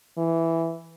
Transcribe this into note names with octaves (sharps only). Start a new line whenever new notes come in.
E3